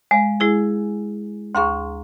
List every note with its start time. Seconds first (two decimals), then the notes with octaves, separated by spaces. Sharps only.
0.11 G#3 F5 G#5
0.40 G#3 E4 G#4
1.55 D2 G#4 F5 A#5 C6 C#6